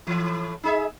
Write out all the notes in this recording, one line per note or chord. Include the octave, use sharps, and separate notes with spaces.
A2 E3
D#4 G#4 E5